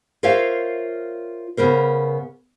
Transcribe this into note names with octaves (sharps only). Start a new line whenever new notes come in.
F4 A#4 C5 C#5 E5 F5
C#3 B3 A#4 C5